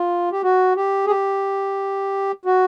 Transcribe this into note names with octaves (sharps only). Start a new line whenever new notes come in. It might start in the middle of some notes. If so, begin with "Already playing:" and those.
Already playing: F4
G4
F#4
G4
G#4
G4
F#4